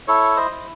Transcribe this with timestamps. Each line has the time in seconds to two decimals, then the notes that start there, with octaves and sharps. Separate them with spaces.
0.08 E4 A4 C#5
0.36 C5 D#5
0.51 E4